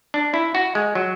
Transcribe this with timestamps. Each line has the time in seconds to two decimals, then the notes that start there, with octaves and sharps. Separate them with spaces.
0.14 D4
0.34 E4
0.55 F#4
0.75 G#3
0.95 F#3